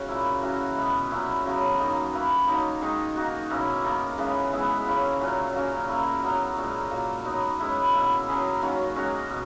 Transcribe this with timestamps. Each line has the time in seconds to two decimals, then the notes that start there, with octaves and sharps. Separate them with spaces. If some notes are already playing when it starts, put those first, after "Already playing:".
Already playing: C#3 C#4 F#4
0.08 A#2 A#3 E4
0.42 E3 A#3 C#4 F#4
0.77 B2 G#3 B3
1.11 A#2 F#3 C#4 E4
1.45 C#3 F#3 B3
1.79 D#3 A#3 D#4
2.13 A#3 E4 B4
2.47 D#3 F#3 A#3 D#4
2.81 D#3 G#3 D#4 G#4
3.16 A#3 D#4 F#4
3.50 B2 A#3 C#4 E4
3.84 D#3 A#3 D#4 A#4
4.18 C#3 E3 G#3 B3
4.52 G#3 B3 E4 B4
4.86 C#3 E3 A#3 C#4
5.20 A#2 F#3 C#4
5.54 F#3 A#3 C#4
5.88 A#3 E4 A#4
6.22 F#3 B3 E4 A#4
6.57 A#2 G#3 C#4
6.90 A#2 F#3 A#3
7.25 F#3 B3 D#4
7.59 G#3 C#4 E4 B4
7.93 B2 A#3 E4
8.28 F#3 C#4 G#4
8.61 D#3 F#3 A#3 C#4
8.96 G#3 C#4 F#4
9.29 B2